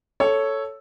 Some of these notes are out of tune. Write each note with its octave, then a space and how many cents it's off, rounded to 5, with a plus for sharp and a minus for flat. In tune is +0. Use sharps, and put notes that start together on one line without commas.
A4 +0 C#5 +0